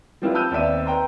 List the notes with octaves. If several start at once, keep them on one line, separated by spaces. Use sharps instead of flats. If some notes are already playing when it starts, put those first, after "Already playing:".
F3 G3 C4 E4 F4 B4
A5 B5 E6 F6 G6 D#7
D#2 B3 C4 D5 E5 D#7
B4 G5 A#5 C6